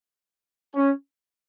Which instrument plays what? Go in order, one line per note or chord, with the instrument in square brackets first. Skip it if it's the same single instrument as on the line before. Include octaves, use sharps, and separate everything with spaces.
[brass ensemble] C#4